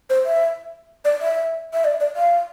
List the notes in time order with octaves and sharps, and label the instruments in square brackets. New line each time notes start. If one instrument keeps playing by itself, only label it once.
[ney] C5
E5
D5
E5
E5
D5
D5
F5